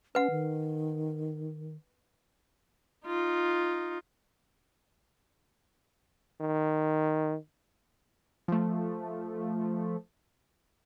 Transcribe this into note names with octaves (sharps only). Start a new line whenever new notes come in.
C#4 B4 F#5
D#3
D#4 F4
D#3
F3 A3